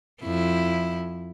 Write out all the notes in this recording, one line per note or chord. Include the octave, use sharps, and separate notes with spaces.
F2 E4